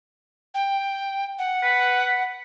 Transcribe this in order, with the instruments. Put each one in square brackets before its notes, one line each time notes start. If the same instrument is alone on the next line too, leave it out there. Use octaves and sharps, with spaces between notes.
[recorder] G5
F#5
[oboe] B4